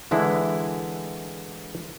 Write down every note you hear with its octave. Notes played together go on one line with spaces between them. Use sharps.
D3 E3 G#3 E4 G#4